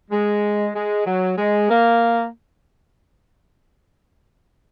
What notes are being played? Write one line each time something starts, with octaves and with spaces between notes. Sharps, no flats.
G#3
G#3
F#3
G#3
A#3